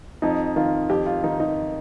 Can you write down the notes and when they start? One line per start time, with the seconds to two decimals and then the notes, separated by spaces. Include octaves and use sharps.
0.22 F2 D#4
0.56 D#3 F4
0.90 F2 G4
1.06 F4
1.24 D#3 D#4
1.40 D#4